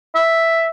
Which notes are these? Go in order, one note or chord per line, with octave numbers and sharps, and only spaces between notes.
E5